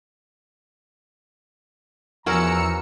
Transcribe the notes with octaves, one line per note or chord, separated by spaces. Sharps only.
E2 F3 C#4 F#4 A#4 A#5 E6 C#7